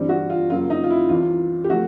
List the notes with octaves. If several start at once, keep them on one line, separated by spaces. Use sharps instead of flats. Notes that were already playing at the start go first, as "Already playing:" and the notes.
Already playing: G2 E3 G3 C4
F#4
F4
F#2 C#3 F#3 A#3 F4
D#4
F4
E4
C2 C3 E3 F4
G4
C3 F3 A3 F#4